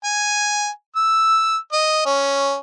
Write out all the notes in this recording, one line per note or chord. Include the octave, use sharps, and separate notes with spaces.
G#5
E6
D#5
C#4